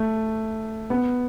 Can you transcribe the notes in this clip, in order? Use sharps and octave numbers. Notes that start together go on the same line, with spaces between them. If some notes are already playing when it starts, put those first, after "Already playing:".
Already playing: A3
B3